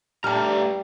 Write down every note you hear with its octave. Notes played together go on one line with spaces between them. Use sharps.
G2 G3 A3 A5 A#5 F6